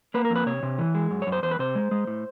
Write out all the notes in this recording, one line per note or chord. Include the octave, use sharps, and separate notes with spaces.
A#3 B4
A#4
F2
B4
C3 C#5
C3
E3
G#3
F#2
C#5
F#2
C5
E2 C5
B4
C3 C5
G#3
G#3
A2